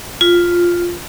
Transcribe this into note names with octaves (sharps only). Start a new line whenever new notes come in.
F4